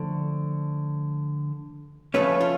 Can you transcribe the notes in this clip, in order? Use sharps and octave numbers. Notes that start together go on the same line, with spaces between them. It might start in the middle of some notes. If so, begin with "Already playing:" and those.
Already playing: D3 F3 A3
C#3 F3 A3 C#4 B4
F4